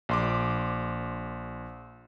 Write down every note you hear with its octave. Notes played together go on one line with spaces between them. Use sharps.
A#1 C6 D6